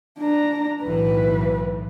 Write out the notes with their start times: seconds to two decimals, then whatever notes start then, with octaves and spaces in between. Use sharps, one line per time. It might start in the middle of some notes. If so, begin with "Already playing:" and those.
0.18 D4 A#5
0.83 B1 A2 E3 B4